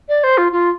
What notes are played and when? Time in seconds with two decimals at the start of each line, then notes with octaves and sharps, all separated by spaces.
0.09 D5
0.24 C5
0.38 F4
0.52 F4